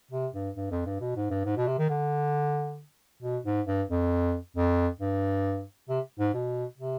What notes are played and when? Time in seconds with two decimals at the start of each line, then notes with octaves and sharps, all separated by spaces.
0.11 C3
0.34 G2
0.56 G2
0.71 F2
0.86 G2
1.01 B2
1.16 G#2
1.31 G2
1.45 G#2
1.57 B2
1.67 C3
1.78 D#3
1.90 D3
3.23 B2
3.46 G#2
3.67 G2
3.90 F2
4.57 F2
5.00 G2
5.89 C3
6.19 G#2
6.34 B2
6.78 C3